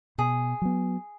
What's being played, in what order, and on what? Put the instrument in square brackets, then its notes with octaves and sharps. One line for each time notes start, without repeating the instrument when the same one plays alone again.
[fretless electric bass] B2 [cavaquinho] G#4
[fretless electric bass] F#3 B3